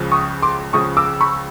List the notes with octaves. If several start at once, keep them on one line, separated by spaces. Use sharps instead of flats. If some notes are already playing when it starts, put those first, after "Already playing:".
Already playing: C#2 C#3 F3
C#6 D#6
C6 D6
C#2 C#3 F3 C#6 D#6
D6 E6
B5 C#6